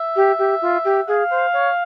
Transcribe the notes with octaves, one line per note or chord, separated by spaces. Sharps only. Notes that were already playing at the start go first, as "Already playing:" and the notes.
Already playing: E5
G4
G4
F4
G4
G#4 F5
C5
C#5